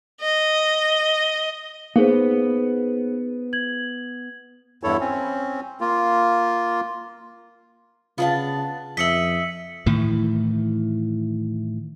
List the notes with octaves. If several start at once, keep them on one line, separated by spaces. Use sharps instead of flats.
D#5
A#3 B3 D#4 G#4 C5
G#6 F#7
E2 G2 E4 A4 C#5
C4 C#4
A#3 F4
C#3 B3 D4 F4 F5 A5
F2 D#5 E5 B6 C#7 F#7
A2 D#3 E3